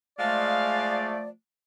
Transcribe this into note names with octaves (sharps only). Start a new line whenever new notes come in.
F3 G#3 A3 D5 F5